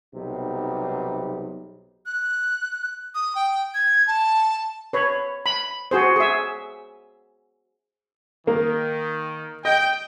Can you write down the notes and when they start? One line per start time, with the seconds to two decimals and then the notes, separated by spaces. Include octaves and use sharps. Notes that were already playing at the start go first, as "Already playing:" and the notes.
0.15 B1 C3 G3 D#4
2.06 F#6
3.15 D#6
3.35 G5
3.74 G#6
4.07 A5
4.93 B4 C#5
5.46 B5
5.91 F#4 G#4 C5
6.16 G#4 E5
8.47 D#3 A#3
9.65 D#5 G5